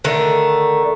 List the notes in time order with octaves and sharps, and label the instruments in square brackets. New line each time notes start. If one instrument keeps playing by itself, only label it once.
[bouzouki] D3 D#3 A3